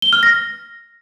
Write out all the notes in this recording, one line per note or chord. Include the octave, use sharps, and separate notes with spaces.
G7
F6
A#6